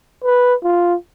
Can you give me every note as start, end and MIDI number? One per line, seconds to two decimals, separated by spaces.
0.24 0.54 71
0.64 0.95 65